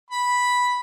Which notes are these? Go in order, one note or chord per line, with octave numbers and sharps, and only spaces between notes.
B5